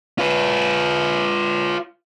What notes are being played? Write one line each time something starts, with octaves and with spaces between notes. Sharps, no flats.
F4 B4